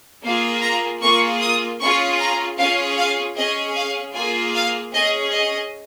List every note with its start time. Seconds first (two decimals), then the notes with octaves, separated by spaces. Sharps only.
0.23 A#3 F4 G#4 F5
0.62 A#5
1.01 A#3 F4 G#4 C#6
1.41 D#6
1.80 C#4 F4 G#4 C#6
2.20 A#5
2.58 C#4 F4 G#4 F5
2.97 F5
3.36 C#4 G#4 D#5
3.76 F5
4.14 A#3 F4 G#4 G#5
4.53 F5
4.93 C#4 G#4 D#5
5.32 D#5